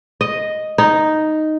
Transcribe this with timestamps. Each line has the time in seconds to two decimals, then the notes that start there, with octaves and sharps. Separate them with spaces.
0.21 D#5
0.78 D#4